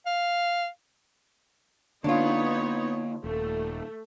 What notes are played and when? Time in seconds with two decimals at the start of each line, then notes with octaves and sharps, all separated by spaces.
0.06 F5
2.04 D3 A#3 B3 D4 D#4 F4 C#5
3.24 D#1 A3